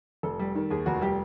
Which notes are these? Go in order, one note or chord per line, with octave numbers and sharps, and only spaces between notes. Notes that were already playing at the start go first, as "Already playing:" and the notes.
F1 A4
G3
D#3
D#2 G#4
F1 F#4
G3 G4